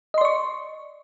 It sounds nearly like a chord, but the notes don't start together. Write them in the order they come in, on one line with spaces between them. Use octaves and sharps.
D#5 C6 D5 C#6